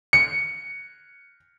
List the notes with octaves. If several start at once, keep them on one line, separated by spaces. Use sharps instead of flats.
C#7